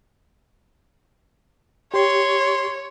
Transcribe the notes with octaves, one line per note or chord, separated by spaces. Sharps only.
G4 C#5 C6